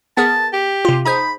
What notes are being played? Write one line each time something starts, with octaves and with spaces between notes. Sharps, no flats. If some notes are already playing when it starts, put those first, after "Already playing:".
B3 G#4 A#4 A5
G4
C3 F4
D#4 G#4 C5 B5